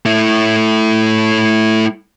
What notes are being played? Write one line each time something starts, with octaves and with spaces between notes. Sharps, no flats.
A3 E4